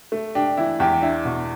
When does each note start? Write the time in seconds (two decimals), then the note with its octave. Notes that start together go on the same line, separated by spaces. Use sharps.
0.12 A3
0.35 D4 G4
0.57 E3 E4
0.80 E2 G4
1.02 D4 E4
1.25 B2